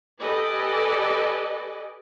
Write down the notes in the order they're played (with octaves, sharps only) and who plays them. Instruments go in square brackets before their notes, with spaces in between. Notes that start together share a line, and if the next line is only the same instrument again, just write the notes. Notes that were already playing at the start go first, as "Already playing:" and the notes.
[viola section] G4 A4 B4 D5 D#5 G#5